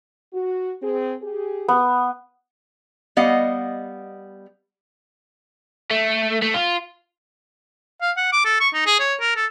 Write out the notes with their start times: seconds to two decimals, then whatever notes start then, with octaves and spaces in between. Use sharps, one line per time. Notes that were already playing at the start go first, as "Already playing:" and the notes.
0.34 F#4
0.82 C4 G#4
1.23 G4 G#4
1.68 B3
3.17 G3 B3 D#5 F5 F#5
5.91 A3
6.42 A3
6.54 F4
8.02 F5
8.17 F#5
8.32 D6
8.45 A4
8.60 C#6
8.74 D#4
8.86 G#4
9.00 C#5
9.20 A#4
9.36 A4